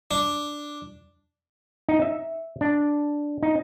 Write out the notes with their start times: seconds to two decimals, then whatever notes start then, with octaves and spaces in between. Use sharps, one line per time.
0.11 D4
1.89 D#4
2.02 E5
2.61 D4
3.43 D#4